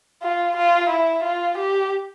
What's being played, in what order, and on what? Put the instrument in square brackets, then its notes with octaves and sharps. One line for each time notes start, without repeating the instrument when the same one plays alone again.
[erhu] F4
F4
E4
F4
G4